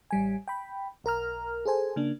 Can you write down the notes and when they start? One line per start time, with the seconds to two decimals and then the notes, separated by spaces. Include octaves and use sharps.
0.11 A1 G3 G#5
0.48 G5 B5
1.04 B1 A#4 A#5 F6
1.65 G#4 A4 C5 G#5
1.96 C#3 A#3 D4